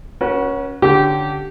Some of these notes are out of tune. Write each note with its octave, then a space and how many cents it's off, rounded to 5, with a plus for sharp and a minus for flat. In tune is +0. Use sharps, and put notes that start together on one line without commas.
C#4 +0 F#4 +0 B4 -45
D3 +0 C#4 +0 G4 -20